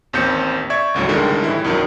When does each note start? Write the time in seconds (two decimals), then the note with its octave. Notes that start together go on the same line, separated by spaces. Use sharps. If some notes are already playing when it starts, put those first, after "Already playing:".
0.13 A1 D#2 C4 G6 C#7
0.70 D5 E5 C#6 G#6
0.94 G#1 C#2 A2 F#3
1.08 C#2 A2 D3 D#3 G3 G#3
1.44 A2 E3 E4
1.64 C2 G2 D#3 F#3